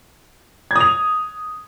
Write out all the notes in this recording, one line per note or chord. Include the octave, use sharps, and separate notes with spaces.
D#6 G#6 F7